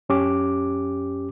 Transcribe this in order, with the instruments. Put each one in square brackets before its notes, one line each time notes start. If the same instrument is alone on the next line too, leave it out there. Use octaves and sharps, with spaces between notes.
[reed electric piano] F#2 C#4 G4 D6